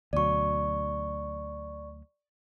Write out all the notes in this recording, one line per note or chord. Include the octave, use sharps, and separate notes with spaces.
D2 B2 F#3 D5 C#6